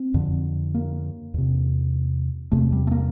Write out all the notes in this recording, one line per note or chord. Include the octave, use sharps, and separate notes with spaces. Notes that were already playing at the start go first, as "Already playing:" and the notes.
Already playing: C4
F2 D3
A#3
E2 C3
E2 C3 A3
G3
A3
A#3